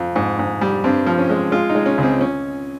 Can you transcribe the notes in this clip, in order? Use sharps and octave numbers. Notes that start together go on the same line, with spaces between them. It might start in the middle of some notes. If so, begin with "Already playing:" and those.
Already playing: F2
G#2
G#2
G3
G2 C4
F3
C#4
G#3
G#3 F4
D#4
G#3
C#4
C#2 C4
C#4